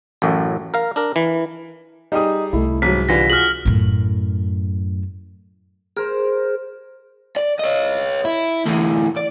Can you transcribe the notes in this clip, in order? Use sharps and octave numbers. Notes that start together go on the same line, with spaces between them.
A1 F#2 A2
A#4 F5
D4 A#4
E3
G3 D#4 G4 G#4 D#6
C2 C3 A3 E4
A1 G#2 F#3 B6
D3 E3 G3 F4 A#6
F#4 G#4 F6 F#7
F#2 A2
G#4 A#4 C5
D5
C#5 D#5
E4
D2 E3
D5